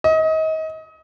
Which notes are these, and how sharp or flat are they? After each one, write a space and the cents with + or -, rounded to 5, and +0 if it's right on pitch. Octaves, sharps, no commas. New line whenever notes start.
D#5 +30